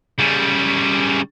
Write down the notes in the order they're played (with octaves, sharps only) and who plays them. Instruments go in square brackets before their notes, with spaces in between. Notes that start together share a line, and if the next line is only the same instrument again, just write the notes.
[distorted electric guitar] C#3 G3